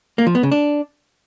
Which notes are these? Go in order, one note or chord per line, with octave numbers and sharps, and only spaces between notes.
A#3
F3
B3
C#3
D4